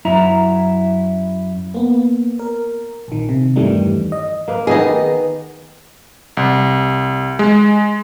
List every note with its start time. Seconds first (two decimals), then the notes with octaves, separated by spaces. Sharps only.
0.05 F#2 E4 A#5
1.74 A#3 B3
2.39 A#4
3.08 A#1 D#3
3.29 C3
3.56 E2 G2 D#3 E3 G3 A3
4.12 D#5
4.48 A#3 B4
4.67 D#3 B3 D#4 G#4 D#5
6.37 C2
7.39 G#3